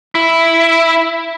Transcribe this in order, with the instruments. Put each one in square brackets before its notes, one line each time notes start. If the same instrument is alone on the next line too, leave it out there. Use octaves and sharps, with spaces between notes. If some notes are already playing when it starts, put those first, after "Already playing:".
[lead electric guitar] E4